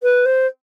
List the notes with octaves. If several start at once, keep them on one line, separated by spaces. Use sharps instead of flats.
B4
C5